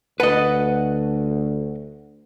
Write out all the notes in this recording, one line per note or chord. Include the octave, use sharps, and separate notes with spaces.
D2 F#4 B4 D#5 F#5 A5